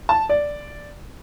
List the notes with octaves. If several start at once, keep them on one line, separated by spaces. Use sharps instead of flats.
A5
D5